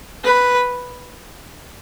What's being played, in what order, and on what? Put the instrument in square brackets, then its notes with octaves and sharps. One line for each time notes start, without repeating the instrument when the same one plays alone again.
[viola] B4